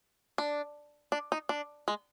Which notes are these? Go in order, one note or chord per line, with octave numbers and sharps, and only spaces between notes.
D4
D4
D#4
D4
G#3